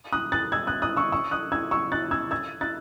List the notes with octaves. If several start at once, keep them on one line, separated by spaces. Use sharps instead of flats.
D#6 F#6
F#6 A6
E6 G#6
D#6 F#6
D#6 F#6
C#6 E6
C#6 E6
D#6 F#6
E6 G#6
C#6 E6
F#6 A6
E6 G#6
E6 G#6
F#6 A6